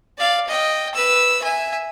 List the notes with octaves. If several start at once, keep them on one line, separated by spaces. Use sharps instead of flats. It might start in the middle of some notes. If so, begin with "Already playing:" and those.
D5 F5
D#5 G5
B4 E6
E5 G#5